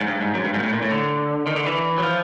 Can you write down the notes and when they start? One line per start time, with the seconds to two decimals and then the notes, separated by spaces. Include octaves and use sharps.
0.01 G#2
0.08 G2
0.21 G#2
0.34 F#2
0.45 G2
0.54 G#2
0.59 A#2
0.63 A2
0.73 A#2
0.82 A2
0.91 D3
1.47 D#3
1.56 D3
1.66 E3
1.98 F#3
2.03 F3